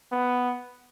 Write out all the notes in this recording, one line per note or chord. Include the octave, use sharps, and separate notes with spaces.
B3